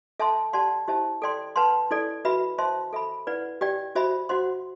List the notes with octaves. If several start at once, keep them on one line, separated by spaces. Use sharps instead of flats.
A4 E5 A5 C6
G4 D5 F#5 A5 C6
E4 G4 C5 E5 A5
A4 D5 G5 C6
B4 F#5 A5 C6
E4 A4 D5
F#4 B4 E5 B5
C5 E5 A5 C6
A4 E5 B5
E4 B4 D5 F#5
G4 D5 G5
F#4 C5 E5 B5
F#4 C5 F#5 C6